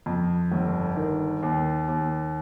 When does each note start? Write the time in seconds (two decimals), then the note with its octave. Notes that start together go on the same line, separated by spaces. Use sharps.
0.06 F2
0.52 G1
0.97 D#3
1.42 D#2
1.88 D#2